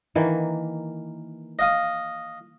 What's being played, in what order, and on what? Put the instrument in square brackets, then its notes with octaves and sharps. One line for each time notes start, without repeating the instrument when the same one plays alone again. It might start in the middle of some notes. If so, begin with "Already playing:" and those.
[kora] D#3 E3 A#3
[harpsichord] D#5 F5 D#6